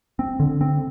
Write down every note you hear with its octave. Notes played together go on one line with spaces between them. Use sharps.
C4
D3
C4